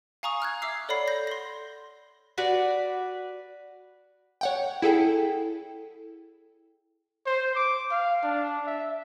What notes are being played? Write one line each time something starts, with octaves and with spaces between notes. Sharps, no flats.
F5 G#5 A#5 C#6 D#6
A#5 F6 F#6 G#6
E5 D6 E6 C7
A4 C#5 D5 F#5 B5 C7
G6 A#6
C6 A#6
F#4 B4 D5
C#5 F#5 G5
E4 G#4 A4 G5
C5
D6
F5
D4
E5